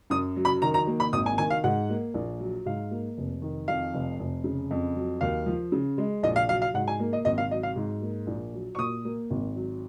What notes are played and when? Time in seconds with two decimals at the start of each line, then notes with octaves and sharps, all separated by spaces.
0.10 F#2 D#6
0.36 F#3
0.45 B5
0.62 D#3 A#5
0.74 A#5
0.87 A#3
1.00 B5
1.13 G#1 D#6
1.26 G#5
1.38 D#3 G#5
1.50 F5
1.64 G#2 F#5
1.89 A#3
2.14 A#1
2.40 F#3
2.66 G#2 F5
2.91 A#3
3.18 F1
3.42 D#3
3.68 F2 F5
3.94 F1
4.20 F1
4.44 C#3
4.71 F2
4.96 F#3
5.21 D#2 F5
5.46 F3
5.72 C#3
5.98 G#3
6.23 A#1 D#5
6.36 F5
6.49 F#3 F5
6.62 F5
6.74 G#2 F#5
6.88 G#5
6.99 A#3
7.13 D#5
7.25 G#1 D#5
7.38 F5
7.51 F#3 D#5
7.63 F5
7.76 G#2
8.02 A#3
8.27 A#1
8.53 F#3
8.75 C#6
8.78 A#2 D#6
9.05 A#3
9.30 G#1
9.56 F#3